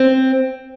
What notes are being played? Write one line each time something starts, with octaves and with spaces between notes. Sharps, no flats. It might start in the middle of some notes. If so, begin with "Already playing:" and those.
Already playing: C4